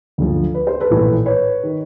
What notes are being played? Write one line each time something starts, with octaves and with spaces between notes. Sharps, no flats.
D2 D3 F3
B4
C5
A4 B4
A#1 A2 E3
B4 C#5
D#3